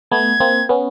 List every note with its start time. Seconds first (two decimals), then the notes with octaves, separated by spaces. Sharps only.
0.12 A3 B3 G#6
0.40 A#3 C4
0.69 B3 C#4